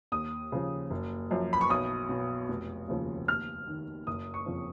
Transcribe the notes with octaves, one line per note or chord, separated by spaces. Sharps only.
D#2 D#6
C#3 F3
F#1
F#2 F3
B5
C#6
B1 D#6
B2
F1
D#2 C#3 F3
D#2 F6
D#3
F#1 D#6
C#6
F2 C#3 F3